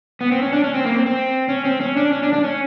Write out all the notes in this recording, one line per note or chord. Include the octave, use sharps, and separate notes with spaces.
B3
C4
C#4
D4
C#4
C4
A#3
C4
C4
C#4
C4
C#4
D4
C#4
D4
D4
C#4